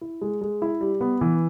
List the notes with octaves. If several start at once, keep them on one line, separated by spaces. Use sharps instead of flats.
E4
G#3
G#3
E4
G3
B3
E3